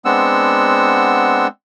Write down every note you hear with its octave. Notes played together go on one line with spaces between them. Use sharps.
G#3 B3 C4 D4 F#5 E6